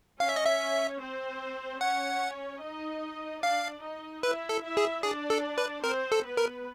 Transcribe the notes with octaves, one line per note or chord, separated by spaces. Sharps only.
C#4 C#5 F5
E5
D#5
E5
C4 C5
C#4 C#5 F#5
D#4 D#5
D4 D5 F5
D#4 D#5
E4 B4 E5
A4
E4 E5
G#4
D4 G#4 D5
A4
B4
C4 A#4 C5
A4
B3 B4
A#4